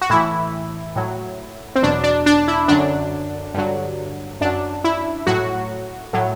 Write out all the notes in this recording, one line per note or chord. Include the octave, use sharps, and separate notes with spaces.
F#4
A2 E3 E4
A2 F#3
C4
E2 B2 F#3 D4
D4
D4
E4
F#2 D3 F#3 D4
G2 D3 F#3
F#2 F#3 D4
E4
A2 F#3 F#4
A2 F#3